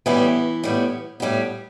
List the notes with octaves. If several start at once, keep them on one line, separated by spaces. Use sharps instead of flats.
A2 E3 G3 B3 E4
A2 G3 B3
A2 G3 B3